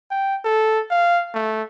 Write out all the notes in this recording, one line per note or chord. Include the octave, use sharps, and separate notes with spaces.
G5
A4
F5
A3